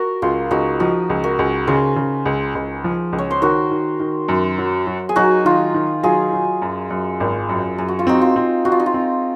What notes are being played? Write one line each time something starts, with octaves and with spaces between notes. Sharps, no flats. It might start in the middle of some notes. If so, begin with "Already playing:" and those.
Already playing: F#4 A#4
C#2 F4
C#2 D#4 F#4
F3 D#4 F#4
C#2
F#4 A#4
C#2
C#3 G#4 C5
C#3
C#2
C#2
F3
C#2
C#5
C5
D#3 F#4 A#4
D#3
D#3
F#2
F#3
F#3
G#4
F#3 D#4 F#4
D#3 F4
D#3
F#3 F4 G#4
F#3
F#2
F#2
G#1
F#2
F#2 G#4
F#4
F4
C4 D#4 F#4
F4
C4
C4 F#4
F4
D#4
F4
C4